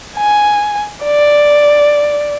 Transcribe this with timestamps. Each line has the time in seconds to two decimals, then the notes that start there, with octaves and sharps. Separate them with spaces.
0.17 G#5
1.04 D5